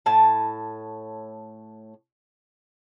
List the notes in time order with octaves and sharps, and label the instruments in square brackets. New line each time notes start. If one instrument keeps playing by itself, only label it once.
[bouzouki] A2 A5